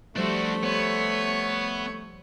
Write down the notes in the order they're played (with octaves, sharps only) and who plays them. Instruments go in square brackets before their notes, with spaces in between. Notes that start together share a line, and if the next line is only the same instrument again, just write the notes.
[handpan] F3 G3 C5 [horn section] A3 [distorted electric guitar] D4 F#4
[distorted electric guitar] B3 [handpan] C5 [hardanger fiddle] C#5